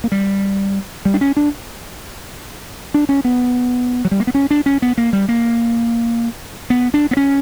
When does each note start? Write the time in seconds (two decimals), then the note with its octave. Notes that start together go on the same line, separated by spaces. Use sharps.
0.04 A#3
0.12 G3
1.05 G3
1.14 D4
1.21 C#4
1.37 D4
2.94 D4
3.09 C#4
3.25 B3
4.05 F#3
4.11 G3
4.20 A#3
4.27 B3
4.34 C#4
4.51 D4
4.66 C#4
4.82 B3
4.98 A#3
5.13 G3
5.29 A#3
6.70 B3
6.94 D4
7.11 B3
7.17 C#4